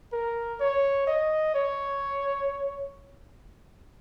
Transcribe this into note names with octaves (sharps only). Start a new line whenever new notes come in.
A#4
C#5
D#5
C#5